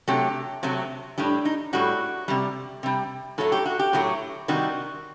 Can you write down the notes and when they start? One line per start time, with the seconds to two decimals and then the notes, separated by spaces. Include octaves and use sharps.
0.08 C3 F#3 A3 G4
0.63 C3 F#3 A3
1.18 A2 G3 D4
1.45 D#4
1.73 A2 G3 F#4
2.28 C3 G3
2.83 C3 G3
3.38 A2 F#3 A3 A4
3.52 G4
3.66 F#4
3.79 G4
3.93 A2 F#3 A3
4.48 C3 D#3 G3 F#4